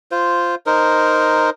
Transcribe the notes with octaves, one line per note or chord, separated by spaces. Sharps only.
F4 C5
D#4 A#4 C5